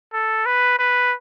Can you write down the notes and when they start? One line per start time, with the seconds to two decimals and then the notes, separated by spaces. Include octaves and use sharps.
0.13 A4
0.46 B4
0.79 B4